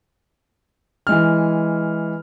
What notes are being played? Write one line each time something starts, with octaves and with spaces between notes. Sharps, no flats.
E3 G#3 F6